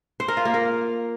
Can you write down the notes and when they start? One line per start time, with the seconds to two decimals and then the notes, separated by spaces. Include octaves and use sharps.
0.20 C5
0.28 A#4
0.37 F4
0.45 A#3
0.54 A#4